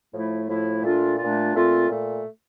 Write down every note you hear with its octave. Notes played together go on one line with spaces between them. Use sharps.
A2 F3 A3 E4
A2 F3 A3 E4
A#2 A3 D4 F4
A#2 A3 D4 F4
A#2 A3 C4 F4
A#2 A3